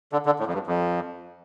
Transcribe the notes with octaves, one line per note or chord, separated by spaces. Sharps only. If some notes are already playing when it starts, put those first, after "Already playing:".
D3
D3
A2
F2
G2
F2